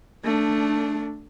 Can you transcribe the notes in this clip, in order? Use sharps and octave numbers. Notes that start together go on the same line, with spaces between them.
A3 D4